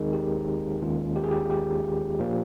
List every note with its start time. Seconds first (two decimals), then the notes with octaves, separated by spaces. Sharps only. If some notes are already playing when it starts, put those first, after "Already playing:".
Already playing: D#2 D#3 G#3 C4 D#4 G#4 A#4
0.13 G4
0.82 D#2 D#3 G#3 C#4 F4
1.16 G4
1.24 G#4
1.31 G4
1.50 G4
2.19 A#2 F3 A#3